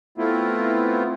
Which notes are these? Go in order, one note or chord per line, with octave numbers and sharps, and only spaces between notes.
A3 B3 C4 E4 F4